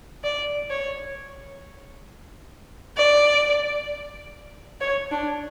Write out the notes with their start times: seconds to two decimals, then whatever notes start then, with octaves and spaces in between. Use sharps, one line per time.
0.24 D5
0.70 C#5
2.98 D5
4.81 C#5
5.11 D4